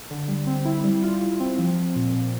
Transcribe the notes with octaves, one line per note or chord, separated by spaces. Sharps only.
D3
G3
C4
E4
G3
F4
G3
C4
F3
F3
A#2
A#2